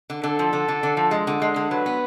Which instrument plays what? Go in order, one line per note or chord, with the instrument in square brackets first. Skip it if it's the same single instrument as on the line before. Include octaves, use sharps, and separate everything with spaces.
[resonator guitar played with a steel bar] D3
[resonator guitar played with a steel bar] D3 [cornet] A4
[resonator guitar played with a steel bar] F3
D3
D3
D3
F3
G#3
D3
G#3
D3
[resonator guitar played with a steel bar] F#3 [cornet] B4
[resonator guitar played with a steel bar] B3